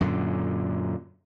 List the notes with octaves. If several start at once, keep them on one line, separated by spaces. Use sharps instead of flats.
F#2 A#2 D3